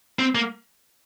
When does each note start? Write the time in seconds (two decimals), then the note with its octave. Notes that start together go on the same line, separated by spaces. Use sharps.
0.19 C4
0.35 A#3